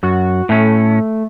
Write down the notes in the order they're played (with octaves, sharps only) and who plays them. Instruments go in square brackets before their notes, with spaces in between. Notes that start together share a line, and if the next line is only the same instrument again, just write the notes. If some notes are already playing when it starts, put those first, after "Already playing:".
[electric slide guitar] F#2 [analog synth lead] F#4
[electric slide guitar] A2 C#4 [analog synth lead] A3